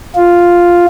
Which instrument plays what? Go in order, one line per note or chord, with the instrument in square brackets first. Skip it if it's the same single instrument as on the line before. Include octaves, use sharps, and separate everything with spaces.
[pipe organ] F4